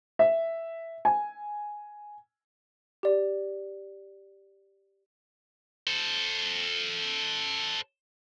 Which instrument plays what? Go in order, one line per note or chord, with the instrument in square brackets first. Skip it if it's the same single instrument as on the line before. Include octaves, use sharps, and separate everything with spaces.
[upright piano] E5
G#5
[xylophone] G4 D5
[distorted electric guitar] A4 C5